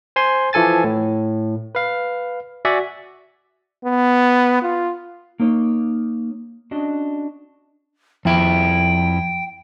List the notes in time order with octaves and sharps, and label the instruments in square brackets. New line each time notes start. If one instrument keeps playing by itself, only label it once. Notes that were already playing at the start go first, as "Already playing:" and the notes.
[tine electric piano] C5 G#5 C6
E3 F3 A4 G#5 A6
A2
B4 F5
F#4 D5 E5 F#5 G#5
[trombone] B3
F4
[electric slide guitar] A#3 D#4 C#5
C#4 D4 F#4 D#5
[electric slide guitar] F2 E4 [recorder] G5